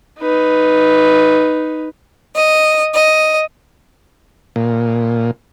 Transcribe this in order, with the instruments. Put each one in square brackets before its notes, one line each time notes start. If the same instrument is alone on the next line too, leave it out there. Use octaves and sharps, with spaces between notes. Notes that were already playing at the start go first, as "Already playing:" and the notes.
[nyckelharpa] D#4 B4
[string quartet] D#5
D#5
[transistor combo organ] A#2